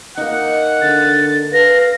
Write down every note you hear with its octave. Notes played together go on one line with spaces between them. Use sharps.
A#3 D#4 F#5
D3 A6
B4 F5 A#6